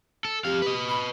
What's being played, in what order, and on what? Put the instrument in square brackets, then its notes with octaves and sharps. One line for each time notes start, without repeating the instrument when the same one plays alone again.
[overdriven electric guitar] A4
[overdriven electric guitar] F2 F5 [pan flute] G4
[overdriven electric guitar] B4 D#5
[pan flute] B5